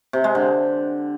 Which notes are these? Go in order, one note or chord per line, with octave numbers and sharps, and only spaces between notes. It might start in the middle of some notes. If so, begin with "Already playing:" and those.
C3
G#3
D3